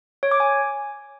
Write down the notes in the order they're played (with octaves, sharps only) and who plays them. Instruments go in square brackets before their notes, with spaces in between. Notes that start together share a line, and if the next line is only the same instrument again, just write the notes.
[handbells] C#5
D6
G#5